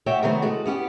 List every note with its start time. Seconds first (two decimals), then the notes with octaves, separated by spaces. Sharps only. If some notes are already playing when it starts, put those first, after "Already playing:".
0.06 F#4 C#5 D5 E5 F#5 G5
0.23 C3 D#3 F#3 A3 B3 C4
0.42 G#3 A3 F#4
0.66 B3 C#4 G4